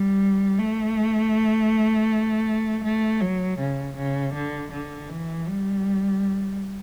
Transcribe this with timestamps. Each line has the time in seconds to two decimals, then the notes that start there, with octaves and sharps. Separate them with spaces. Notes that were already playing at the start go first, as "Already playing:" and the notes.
Already playing: G3
0.58 A3
2.84 A3
3.21 F#3
3.59 C#3
3.97 C#3
4.34 D3
4.72 D3
5.10 E3
5.47 G3